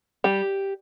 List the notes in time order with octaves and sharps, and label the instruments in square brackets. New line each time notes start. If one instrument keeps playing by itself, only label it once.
[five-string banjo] G3 G4